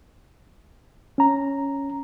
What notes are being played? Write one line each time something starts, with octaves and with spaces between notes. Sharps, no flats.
C#4 A#5